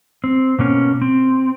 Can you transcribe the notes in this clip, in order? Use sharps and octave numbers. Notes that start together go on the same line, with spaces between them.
C4
B2 A#3 C#4
C4